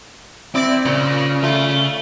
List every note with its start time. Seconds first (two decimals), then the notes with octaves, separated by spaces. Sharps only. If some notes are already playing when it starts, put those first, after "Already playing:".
0.55 C4 E4 D5
0.86 A#2 C#3
1.43 A3 F4